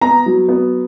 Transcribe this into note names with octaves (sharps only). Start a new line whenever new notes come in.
B3 A#5
F#3
B3